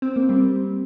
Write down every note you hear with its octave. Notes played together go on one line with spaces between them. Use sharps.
C4
A#3
G3 C4